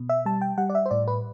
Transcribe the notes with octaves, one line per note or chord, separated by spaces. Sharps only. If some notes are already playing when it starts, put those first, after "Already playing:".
Already playing: B2
E5
G3 A5
G5
G3 F#5
D5
E5
C5
A2 D5
B4